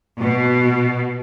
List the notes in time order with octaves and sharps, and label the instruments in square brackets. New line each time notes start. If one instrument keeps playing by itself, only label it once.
[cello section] B2